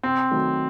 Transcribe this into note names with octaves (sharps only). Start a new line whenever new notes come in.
C3 C4
D#3 F#3 A3